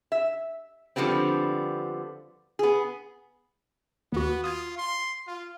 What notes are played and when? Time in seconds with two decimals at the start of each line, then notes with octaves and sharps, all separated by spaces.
0.12 E5
0.96 D3 F3 G3 B3 C4
2.59 B3 G#4
4.12 D#2 B3 F#4
4.44 F4 D#6 G#6
4.78 C6
5.27 F4